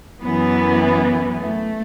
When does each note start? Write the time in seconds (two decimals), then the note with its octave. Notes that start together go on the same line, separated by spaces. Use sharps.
0.22 F#2 E3 B3
1.37 A3